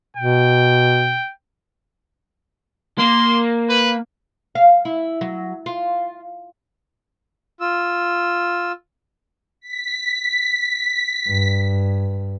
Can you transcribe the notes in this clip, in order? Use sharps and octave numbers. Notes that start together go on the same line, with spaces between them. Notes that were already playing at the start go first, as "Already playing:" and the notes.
B2 G5
A#3 C6
B4
F5
E4
F#3
F4
F4 E6
B6
G2